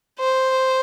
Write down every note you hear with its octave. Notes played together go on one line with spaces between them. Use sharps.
C5